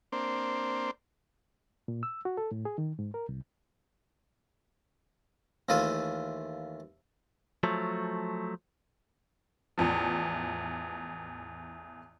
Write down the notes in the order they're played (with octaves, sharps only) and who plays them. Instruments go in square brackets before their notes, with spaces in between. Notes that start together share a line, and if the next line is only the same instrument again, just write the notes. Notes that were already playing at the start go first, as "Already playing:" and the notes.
[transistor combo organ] A#3 C4 D4 C5
[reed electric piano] A#2
E6
F#4
A4
A2
G#4
D#3
G#2
A#4
C2
[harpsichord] D#2 E3 A3 F4 A5 D#6
[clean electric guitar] F3 F#3 A3
[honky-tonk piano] A1 E2 F3